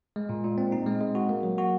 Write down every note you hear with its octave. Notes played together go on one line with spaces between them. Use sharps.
G#3
A#2
A#2
C4
D#4
G#3
G#3
F#4
A#3
F#3
F#4